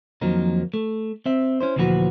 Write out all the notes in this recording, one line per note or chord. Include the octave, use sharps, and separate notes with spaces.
F2 D#3 F3 F#3 A#3 D#4
A3
C4 E5
C#4 E4 C5
D2 A#2 E3 F3 F#4 B4